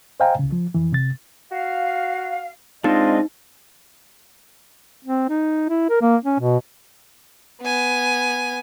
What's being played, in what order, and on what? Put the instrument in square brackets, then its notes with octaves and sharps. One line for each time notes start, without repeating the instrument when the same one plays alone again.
[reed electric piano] C5 D#5 F5 G5 G#5 A#5
C2 C#3
F3
F2 E3
C3 A6
[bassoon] F#4 [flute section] F5
[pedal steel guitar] G#3 C4 D4 [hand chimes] D#4 [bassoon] F4 [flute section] D#5
[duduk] C4
D#4
E4
A#4
A#3
C#4
B2
[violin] B3 G#5